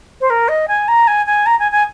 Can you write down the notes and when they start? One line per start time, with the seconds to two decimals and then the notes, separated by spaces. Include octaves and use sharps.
0.20 C5
0.29 A#4
0.48 D#5
0.67 G#5
0.87 A#5
1.07 G#5
1.26 G#5
1.46 A#5
1.59 G#5
1.71 G#5